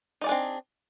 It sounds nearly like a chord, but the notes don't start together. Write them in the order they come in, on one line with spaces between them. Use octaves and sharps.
D#4 D5 G#4 D4 C4